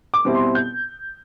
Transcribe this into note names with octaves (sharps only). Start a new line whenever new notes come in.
D6
B2 G3 C4 E4
C6
G6